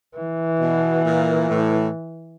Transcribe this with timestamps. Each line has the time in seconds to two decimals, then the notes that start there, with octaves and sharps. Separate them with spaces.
0.17 E3
0.60 B2
1.05 A#2
1.48 A2